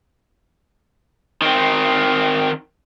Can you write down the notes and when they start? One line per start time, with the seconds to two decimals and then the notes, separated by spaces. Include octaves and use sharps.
1.42 D#3 C4